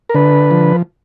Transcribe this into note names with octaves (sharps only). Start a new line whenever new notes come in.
A#4
D3 B4
F3